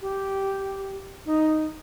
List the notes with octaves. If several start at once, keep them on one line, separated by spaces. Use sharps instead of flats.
G4
D#4